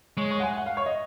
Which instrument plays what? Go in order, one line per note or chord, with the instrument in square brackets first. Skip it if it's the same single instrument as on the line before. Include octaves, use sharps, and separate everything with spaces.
[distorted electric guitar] G#3 [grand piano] C#5
[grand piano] C#5
F#5
G#5
F#5
F5
C#5
D#5